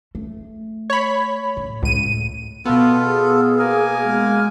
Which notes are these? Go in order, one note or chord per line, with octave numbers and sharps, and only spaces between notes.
A3
C#5 B5
A2
C#2 A2 D#7
B2 B3 F4 A4
G#4
A#3 A#4 G#5
G#3